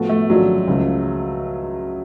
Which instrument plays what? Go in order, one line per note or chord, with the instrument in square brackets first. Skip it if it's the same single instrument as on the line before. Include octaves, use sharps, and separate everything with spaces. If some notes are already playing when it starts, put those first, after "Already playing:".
Already playing: [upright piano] A2 F3 B3 F#4 A4
[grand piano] A3
[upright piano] G#1 F#2 F3 G#3 D4 [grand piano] F#3
[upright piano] C#2 C#3 F3